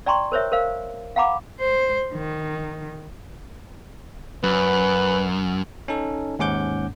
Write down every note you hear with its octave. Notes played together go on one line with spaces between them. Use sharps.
D5 G5 A#5 C6 C#6
A#4 C5 C#5 E5
A#4 C5 F5
F5 F#5 A#5 B5 D6
C5
D#3
F#2 B4
C#4 D#4 A4
D#2 G#2 C#4 F#5 D6 G6